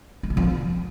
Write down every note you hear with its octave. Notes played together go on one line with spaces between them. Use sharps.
G#3
C#3
F2
G3